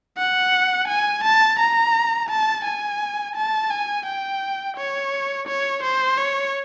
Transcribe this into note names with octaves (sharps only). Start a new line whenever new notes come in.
F#5
G#5
A5
A#5
A5
G#5
A5
G#5
G5
C#5
C#5
C5
C#5